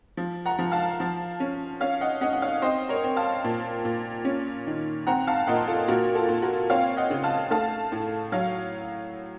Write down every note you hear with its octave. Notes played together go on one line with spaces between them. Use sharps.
F3
F#5 A#5
F3
F5 A5
F3
C#4
C#4 C#5 F5
D#5 F#5
C#4 D#5 F#5
F#5
C#5 F5
C4 C5 D#5
A#4 C#5
C4
F5 A5
A#2
A#2
C#4
D#3
C4 F#5 A#5
F5 A5
A#2 D#5 F#5
F4 A4
A#2 F#4 A#4
F4 A4
A#2
F#4 A#4
C4 C#5 F5
D#5 F#5
C#3
F5 A5
A3 F5 A5
A2
F#3 C#5 F5